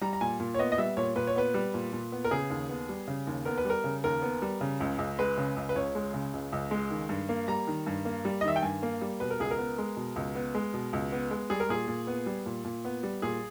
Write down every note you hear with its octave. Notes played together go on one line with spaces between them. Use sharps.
G3 A#5
A#5
A#2 G#5
A#2
C#5
B3 D#5
D#5
G3 E5
A#2 C#5
A#2 B4
C#5
B3 B4
G3
A#2
A#2
B3
A#4
C#3 G#4
D#2
B3
G3
C#3
D#2
B3 A#4
B4
G3 A#4
C#3
D#2 A#4
B3
G3
C#3
C#2
C#2
G#3 B4
C#3
C#2
B4
C#2 C#5
G#3
C#3
C#2
C#2
G#3
D#3
G2
A#3
G3 A#5
D#3
G2
A#3
G3
D#5
D#3 E5
G5
G2 G#5
A#3
G3
B2 B4
A#4
C#2 G#4
A#4
B3
G#3
B2
C#2
B3
G#3
B2
C#2
B3
G#3
G3 G#4
A#4
A#2 G#4
A#2
B3
G3
A#2
A#2
B3
G3
A#2 G#4